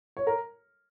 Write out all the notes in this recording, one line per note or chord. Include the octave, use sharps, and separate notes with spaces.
C#5
A#4